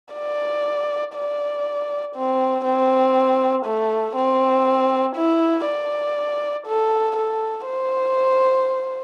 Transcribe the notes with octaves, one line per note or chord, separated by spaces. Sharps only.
D5
D5
C4
C4
A3
C4
E4
D5
A4
A4
C5